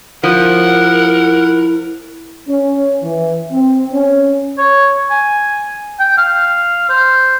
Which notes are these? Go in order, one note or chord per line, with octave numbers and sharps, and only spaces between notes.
F3 E4 A#4 F#5
C#4
E3
C4
C#4
C#5
G#5
G5
F5
C5